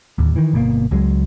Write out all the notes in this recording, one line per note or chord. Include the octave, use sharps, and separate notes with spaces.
D1 D#2
D#3 E3
G1 B2 A#3
C#2 F#3 G#3